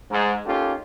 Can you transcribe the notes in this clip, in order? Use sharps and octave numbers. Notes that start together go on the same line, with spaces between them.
G#2
A#3 C#4 D#4 F4 G4 A4